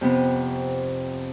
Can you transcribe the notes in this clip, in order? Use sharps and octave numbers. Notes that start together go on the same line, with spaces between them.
F2 C3 B3